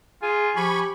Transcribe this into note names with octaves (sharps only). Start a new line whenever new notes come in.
F4 G#4 G#5
F3 G4 G#5 B5 C#6